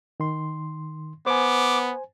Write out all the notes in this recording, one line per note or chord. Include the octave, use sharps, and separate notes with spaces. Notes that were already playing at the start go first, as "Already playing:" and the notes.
D#3 C6
B3 C5 G#5 D6